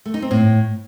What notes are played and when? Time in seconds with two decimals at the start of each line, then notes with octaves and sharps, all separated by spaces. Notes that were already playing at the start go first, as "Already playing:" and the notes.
0.06 A3
0.14 D#4
0.22 C4
0.31 A2